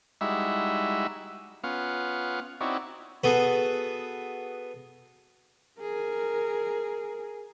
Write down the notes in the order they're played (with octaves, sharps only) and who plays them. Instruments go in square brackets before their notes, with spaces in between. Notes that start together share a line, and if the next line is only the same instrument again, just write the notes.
[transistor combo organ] G3 G#3 D#4 E4 F#4 E5
B3 C#4 F4 F5 F#5
C4 D#4 E4 F#4 C#5 D5
[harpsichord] B3 F#4 G#4 A4
[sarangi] G#4 [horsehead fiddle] A#4